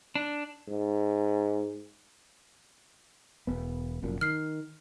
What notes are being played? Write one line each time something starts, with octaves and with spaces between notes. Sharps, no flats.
D4
G#2
E1 B3
F1 F#2 A#2
D#3 F6 C7